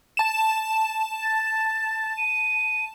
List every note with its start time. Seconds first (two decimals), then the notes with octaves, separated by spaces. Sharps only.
0.17 A5 E7
1.22 A6
2.17 D#7